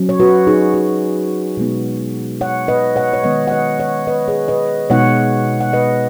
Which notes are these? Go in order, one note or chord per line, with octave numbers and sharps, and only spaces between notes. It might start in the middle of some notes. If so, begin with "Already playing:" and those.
Already playing: F#3 C#4
C#5
F#4 B4
D#4 G#4
F#4
B2 G#3 B3 D#4
C#5 F#5
B4 D#5
C#5 F#5
C#5
D#3 G#3 B3 B4 D#5
F#5
B4 D#5
C#5 F#5
B4 D#5
G#4 C#5
B4 D#5
B2 G#3 B3 D#4 C#5 F#5
F#5
B4 D#5